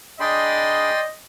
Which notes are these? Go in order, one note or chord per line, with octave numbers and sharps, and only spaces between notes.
D4 G#4 D5 D#5 G5 B5 C6